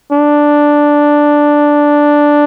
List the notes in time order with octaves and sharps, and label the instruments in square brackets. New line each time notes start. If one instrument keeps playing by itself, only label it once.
[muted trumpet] D4